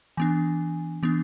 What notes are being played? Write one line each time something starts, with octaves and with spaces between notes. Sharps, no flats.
E3 B3 D4 G#5
E3 B3 D4